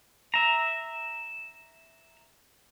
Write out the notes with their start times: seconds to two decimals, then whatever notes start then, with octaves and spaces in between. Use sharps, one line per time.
0.34 E5 A#5